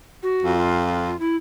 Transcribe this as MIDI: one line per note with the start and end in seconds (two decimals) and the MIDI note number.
0.23 0.54 66
0.43 1.14 41
0.57 1.16 65
1.19 1.36 64